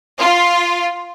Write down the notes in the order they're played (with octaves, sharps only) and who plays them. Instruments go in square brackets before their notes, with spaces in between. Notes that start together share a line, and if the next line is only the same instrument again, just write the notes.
[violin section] F4